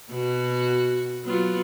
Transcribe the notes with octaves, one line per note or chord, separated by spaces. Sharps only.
B2 F#4
F#3 B3 F4